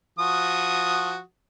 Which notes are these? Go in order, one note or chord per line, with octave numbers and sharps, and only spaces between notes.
F3 F#4 D#6